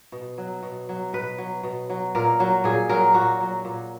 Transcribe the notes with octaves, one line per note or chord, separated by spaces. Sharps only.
B2
F#3
B2
F#3
B2 B4
F#3
B2
F#3
A#2 A#4
F#3
A#2 G#4
F#3 A#4
A#2 F#4
F#3
A#2